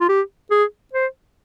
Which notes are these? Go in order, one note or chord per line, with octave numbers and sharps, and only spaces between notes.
F4
G4
G#4
C5